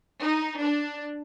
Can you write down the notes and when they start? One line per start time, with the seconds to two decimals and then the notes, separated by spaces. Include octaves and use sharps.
0.22 D#4
0.60 D4